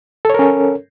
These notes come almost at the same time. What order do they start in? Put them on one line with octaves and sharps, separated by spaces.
A4 C#5 A#4 C#4